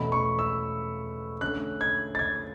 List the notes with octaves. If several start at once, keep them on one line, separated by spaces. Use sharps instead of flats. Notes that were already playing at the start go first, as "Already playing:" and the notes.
Already playing: E2 B2 A3 C#4 B5
C#6
E6
D3 A3 C#4 F#6
G#6
A6
G#6